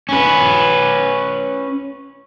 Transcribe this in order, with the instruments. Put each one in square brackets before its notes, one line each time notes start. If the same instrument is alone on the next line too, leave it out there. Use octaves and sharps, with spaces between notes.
[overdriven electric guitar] C#4 B4